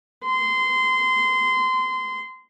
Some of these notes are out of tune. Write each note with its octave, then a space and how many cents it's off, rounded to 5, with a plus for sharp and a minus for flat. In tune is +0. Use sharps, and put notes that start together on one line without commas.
C6 -20